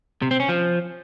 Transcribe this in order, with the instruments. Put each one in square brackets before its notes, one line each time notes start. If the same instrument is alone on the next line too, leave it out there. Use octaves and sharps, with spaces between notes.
[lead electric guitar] C3
C4
C#4
F3